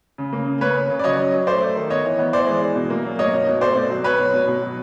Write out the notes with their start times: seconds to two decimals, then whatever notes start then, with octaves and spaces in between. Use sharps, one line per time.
0.18 C#3
0.33 A#3
0.47 C#3
0.61 A#3 B4 C#5
0.76 C#3
0.90 C#3
0.99 D5
1.04 F#3 C#5 D#5
1.19 F#3
1.33 F#3
1.47 A3 C5 D5
1.62 A3
1.76 D#3
1.90 B3 C#5 D#5
2.05 E3
2.19 B3
2.33 E3 C5 D5
2.47 G#3
2.62 E3
2.76 B2
2.90 A#3
3.05 F#3
3.19 A#3 C#5 D#5
3.33 B2
3.47 B2
3.61 A3 C5 D5
3.76 B2
3.90 F#3
4.04 F#3 B4 C#5
4.19 B2
4.34 B2
4.47 B2
4.62 F#3